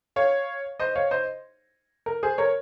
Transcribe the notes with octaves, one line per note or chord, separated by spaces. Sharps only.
C#5 F5
C5 D#5
C#5 F5
C5 D#5
A#4
G#4 C5
A#4 C#5